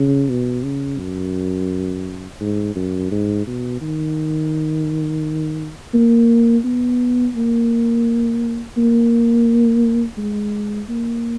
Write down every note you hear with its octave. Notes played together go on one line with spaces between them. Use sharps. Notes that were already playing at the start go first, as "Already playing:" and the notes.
Already playing: C#3
B2
C#3
F#2
G#2
F#2
G#2
B2
D#3
A#3
B3
A#3
A#3
G#3
A#3